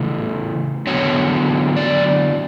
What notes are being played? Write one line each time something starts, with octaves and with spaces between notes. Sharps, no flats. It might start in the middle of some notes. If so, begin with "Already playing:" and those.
Already playing: C#3 E3 A3
D3 F#3 B3 C#5
D5